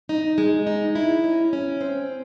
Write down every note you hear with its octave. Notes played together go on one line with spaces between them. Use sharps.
D#4
G#3
D#4
E4
C#4
C#4
C4